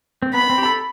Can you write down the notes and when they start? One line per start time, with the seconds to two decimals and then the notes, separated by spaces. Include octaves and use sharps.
0.22 C4
0.34 B3 B5
0.50 C4
0.58 G4
0.65 A4